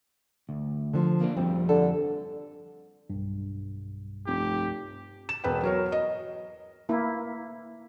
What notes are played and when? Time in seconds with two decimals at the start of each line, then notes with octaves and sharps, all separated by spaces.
0.49 D2
0.94 D3 F3
1.20 A#3 C4 D4
1.37 F2 F3 G3 C4
1.69 D3 A4
3.10 B1 G2
4.26 F1 G4
5.29 E7
5.44 E1 B4 G5
5.63 F#3 A#4 C#5
5.92 D#5
6.89 A#3 E4